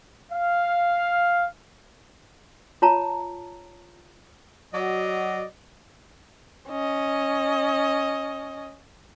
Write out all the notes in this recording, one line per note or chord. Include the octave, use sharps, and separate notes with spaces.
F5
F4 C#5 A5 A#5
F#3 F#4 D5 D#5
C#4 D#5